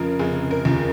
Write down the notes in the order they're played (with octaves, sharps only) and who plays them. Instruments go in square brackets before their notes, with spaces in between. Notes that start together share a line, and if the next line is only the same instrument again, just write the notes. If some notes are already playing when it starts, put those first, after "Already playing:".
Already playing: [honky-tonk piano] F1 C#3 F3 A#4
F1 G#4
A#4
D#2 C#3 F3